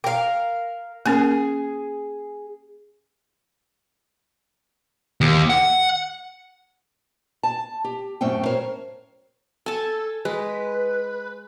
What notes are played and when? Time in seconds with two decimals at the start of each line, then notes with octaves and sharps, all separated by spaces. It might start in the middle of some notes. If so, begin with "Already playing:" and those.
0.04 A#4 F5 G5
1.06 A#3 C#4 G#4 A#4
5.21 D#2
5.50 F#5
7.43 A5
7.84 G4
8.21 F#2 A2 C4 C#4 G5
8.46 A#4 C5 C#5
9.66 A4 G#5 A5
10.25 G#3 B4